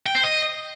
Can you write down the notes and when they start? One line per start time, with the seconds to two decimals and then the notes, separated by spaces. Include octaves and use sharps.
0.06 G5
0.15 C5
0.23 D#5